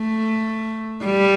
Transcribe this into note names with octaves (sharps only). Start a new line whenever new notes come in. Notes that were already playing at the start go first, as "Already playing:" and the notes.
Already playing: A3
G3